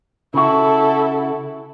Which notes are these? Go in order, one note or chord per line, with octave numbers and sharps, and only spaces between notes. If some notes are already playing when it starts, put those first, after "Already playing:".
C#3 E4 F#4 A4